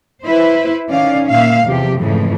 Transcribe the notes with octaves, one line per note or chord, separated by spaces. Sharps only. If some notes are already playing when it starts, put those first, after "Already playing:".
E4 B4 C5
D#3 C#4 D5 F5
A#2 A#3 E5 F5
E2 C3 F3 G4
F2 G#2 C#3 E3 F3 A3